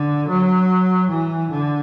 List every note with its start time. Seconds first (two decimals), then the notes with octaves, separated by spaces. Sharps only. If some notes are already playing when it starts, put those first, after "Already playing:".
Already playing: D3
0.28 F#3
1.09 E3
1.50 D3